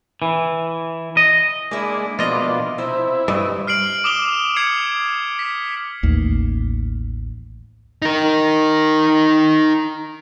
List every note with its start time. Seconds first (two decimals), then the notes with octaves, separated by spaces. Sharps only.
0.22 E3
1.17 D#5
1.71 G#3 A#3 D4 E4
2.19 B2 F3 D4 F4 D#5
2.78 C3 E4 C5
3.28 G2 D#5
3.67 F6 C7 D7 F#7
4.04 D6 D#6 E7 G7
4.56 D#6 G#6 C7 C#7
5.39 B6
6.03 A1 D#2
8.02 D#4 A#4